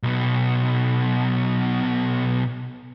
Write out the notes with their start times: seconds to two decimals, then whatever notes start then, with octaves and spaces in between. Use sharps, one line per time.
0.03 B1 B2